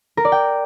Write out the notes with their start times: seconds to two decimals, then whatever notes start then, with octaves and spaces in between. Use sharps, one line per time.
0.17 A#4
0.25 D5
0.32 G5